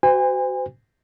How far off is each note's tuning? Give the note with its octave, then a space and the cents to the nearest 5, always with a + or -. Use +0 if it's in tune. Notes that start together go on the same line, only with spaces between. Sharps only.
F#4 +25 C5 -40 G#5 -40